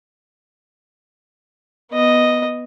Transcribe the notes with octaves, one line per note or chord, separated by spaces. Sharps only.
B3 D#5